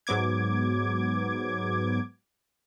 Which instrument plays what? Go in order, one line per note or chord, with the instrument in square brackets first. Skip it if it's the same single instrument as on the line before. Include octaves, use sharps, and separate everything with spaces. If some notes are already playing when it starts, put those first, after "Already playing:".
[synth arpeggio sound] G#2 F#3 B3 D6 G#6